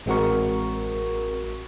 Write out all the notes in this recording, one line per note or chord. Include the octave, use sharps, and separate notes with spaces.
A1 G#3 C4 F#4 A#4 C#6